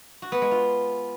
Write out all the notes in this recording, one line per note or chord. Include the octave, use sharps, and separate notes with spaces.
F#4
B3
G#3
F4